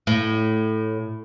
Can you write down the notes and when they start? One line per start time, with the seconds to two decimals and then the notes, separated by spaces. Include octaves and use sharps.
0.07 A2